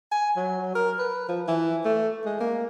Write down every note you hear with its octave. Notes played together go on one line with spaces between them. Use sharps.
G#5
F#3
A#4
B4
F3
E3
A3
G#3
A#3